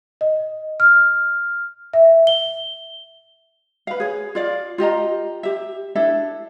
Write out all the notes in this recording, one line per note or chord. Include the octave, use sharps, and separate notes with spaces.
D#5
F6
E5
G7
B4 F5
G#4 C#5
F4 D5 F5
F4 G4 D#5 A#5
G4 E5
D4 E4 A4 E5